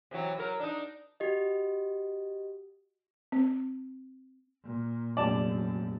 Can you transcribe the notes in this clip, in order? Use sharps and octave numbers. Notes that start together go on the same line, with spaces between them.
C3 E3 F#3
F#3 A#4
D4 D#4
F#4 G4 D#5
C4
A#2
F1 A#1 F#2 D5 A5